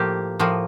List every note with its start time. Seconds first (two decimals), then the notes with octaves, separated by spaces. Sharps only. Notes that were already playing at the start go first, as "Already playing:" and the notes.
Already playing: A2 F3 A#3 G4
0.39 A2 F3 A#3